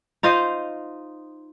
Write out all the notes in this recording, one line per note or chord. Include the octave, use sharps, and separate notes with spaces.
D#4 F4 C5 D#5